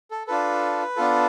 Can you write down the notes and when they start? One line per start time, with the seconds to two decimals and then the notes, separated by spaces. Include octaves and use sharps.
0.11 A4
0.27 D4 F4 A4 B4
0.96 B3 D4 F4 A4